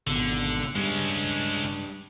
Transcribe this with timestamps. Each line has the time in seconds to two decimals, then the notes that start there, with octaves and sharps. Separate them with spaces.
0.07 G#1 B2 D3
0.76 G2 G#3 C#4